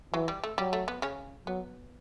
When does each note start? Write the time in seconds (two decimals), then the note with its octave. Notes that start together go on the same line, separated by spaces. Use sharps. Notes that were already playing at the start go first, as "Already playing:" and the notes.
0.14 E3 F#3
0.28 G3
0.44 A3
0.58 F#3 G3
0.73 A3
0.88 B3
1.02 C#3 C#4
1.47 F#3 B3